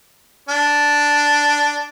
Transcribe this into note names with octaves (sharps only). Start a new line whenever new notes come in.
D4